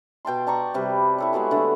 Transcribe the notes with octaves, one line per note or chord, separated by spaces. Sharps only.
B2 G5 A5 C6
D5 A5 A#5 C#6
C3 G3 B4
E4 A4 C#5
G#3 B3 F#4 G#4
D3 A3